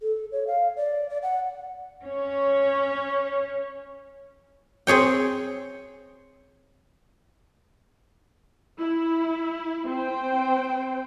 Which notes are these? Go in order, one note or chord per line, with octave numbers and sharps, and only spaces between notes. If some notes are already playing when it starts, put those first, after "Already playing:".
A4
C#5
F5
D5
D5
F#5
C#4 C#5
C4 G#4 C#5 G5
E4
C4 C5 G5